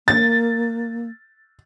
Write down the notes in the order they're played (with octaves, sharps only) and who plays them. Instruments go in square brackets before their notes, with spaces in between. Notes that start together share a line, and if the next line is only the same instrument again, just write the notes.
[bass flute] A#3 [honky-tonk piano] A6